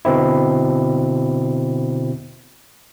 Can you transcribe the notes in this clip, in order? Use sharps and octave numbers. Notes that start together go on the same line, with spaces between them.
B2 D3 C4 E4